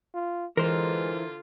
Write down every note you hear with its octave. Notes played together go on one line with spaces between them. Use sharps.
F4
D3 E3 G#3 F4 A#4 C5